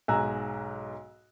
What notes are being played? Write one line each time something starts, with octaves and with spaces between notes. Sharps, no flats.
B1 G#2 G#5 A#5 E6 F#6